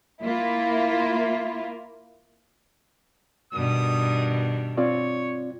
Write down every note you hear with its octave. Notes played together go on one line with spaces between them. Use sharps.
A#3 E4 F4
G2 B2 D#3 D#6
C4 F4 C#5 D5